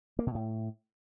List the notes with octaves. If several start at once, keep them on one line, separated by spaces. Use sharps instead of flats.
A#3
B2
A2